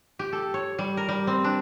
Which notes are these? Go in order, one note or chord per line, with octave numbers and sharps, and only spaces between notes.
G4
A4
C#5
G3
A#4
G3
C4
D4